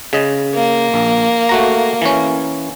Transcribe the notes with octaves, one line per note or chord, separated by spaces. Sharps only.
C#3 D#5
A#3
A#1
A3 F#4 A#5
E3 C#4